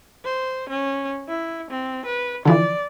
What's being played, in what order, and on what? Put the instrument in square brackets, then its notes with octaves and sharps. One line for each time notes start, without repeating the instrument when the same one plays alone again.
[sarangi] C5
C#4
E4
C4
B4
[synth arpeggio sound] D3 E3 F3 [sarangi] D5